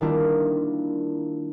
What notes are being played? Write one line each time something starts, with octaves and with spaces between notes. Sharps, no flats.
D#3 G3 A#3 D4 E4 F4